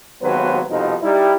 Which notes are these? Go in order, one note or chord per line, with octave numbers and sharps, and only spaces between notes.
G#1 D#2 F#3 B3 B4 C5
C2 F2 B2 D#4
G3 D#4 E4